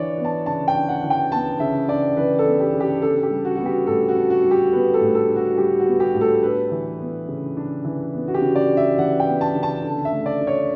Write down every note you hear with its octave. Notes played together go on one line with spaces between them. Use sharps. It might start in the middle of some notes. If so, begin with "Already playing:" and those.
Already playing: E3 D4 C#5 D5
B3
A5
C#3 A5
G5
D4
F#5
E3
G5
B3 A5
C#3 E5
D4 D5
E3 B4
A4
B3
G4
C#3
G4
D4 A4
G4
G3
F#4
B3 F#4
G4
A2 A4
F#4
D4
F#4
G3
G4
B3 B4
A4
A2
A4
D4
F#4
G3 G4
F#4
B3
G4
A2
A4
D4 B4
E3
B3
C#3
D4
E3
B3
F#4
G4
C#3
D5
D4
E5
E3 F#5
G5
B3
A5
C#3
A5
D3
E5
A3
D5
D4
C#5